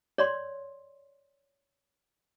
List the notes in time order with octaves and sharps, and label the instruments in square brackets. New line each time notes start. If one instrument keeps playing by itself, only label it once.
[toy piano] C#5 D5 C6